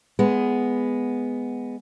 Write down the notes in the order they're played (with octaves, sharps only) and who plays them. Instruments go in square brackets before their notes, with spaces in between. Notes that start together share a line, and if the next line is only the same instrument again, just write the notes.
[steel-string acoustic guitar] G#3 B3